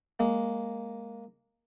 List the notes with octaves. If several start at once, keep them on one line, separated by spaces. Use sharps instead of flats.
G#3 A#3